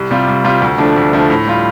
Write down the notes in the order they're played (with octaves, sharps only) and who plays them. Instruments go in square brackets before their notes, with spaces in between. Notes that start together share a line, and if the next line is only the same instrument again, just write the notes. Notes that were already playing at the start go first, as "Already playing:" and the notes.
Already playing: [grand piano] C2
C3 G3 F4
C2
C3 G3 F4
D2
D3 F3 A3 D4
D2
D3 F3 A3 D4
A2
G3 F4